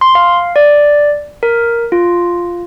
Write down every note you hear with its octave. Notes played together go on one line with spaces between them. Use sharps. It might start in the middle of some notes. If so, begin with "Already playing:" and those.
C6
F5
D5
A#4
F4